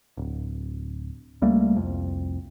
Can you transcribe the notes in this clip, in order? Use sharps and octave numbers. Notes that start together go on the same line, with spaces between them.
D1
C#2 G3 A3 A#3
C2 F2